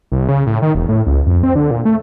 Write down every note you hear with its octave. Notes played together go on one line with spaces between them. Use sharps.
C2
C#3
A2
D#3
E1
A2
C#2
F2
C4
D3
A#2
A3